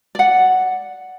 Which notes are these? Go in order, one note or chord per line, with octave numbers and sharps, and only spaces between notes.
D5 F#5